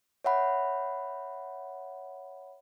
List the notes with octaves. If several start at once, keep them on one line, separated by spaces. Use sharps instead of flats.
C#5 E5 F#5 B5